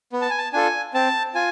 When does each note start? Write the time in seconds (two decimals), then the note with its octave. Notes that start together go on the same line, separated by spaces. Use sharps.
0.13 B3
0.21 A5
0.30 G#5
0.38 A5
0.53 D4 F4 A4 G#5
0.94 C4 A5
1.35 F4 G#5